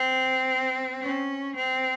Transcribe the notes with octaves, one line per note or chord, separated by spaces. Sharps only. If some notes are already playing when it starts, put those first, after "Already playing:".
Already playing: C4
C#4
C4